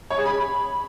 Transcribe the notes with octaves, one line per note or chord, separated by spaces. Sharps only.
C#5
G#4
B5